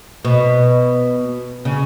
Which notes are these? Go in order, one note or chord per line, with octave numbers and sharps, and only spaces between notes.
B2
C#3